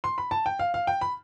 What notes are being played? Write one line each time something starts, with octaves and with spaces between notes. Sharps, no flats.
C6
B5
A5
G5
F5
F5
G5
B5